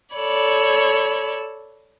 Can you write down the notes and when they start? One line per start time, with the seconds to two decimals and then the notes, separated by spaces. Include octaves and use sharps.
0.15 A4 C#5 D5 B5